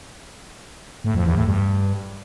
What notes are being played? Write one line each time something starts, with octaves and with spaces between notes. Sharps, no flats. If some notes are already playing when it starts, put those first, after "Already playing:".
A2
F2
E2
A2
G2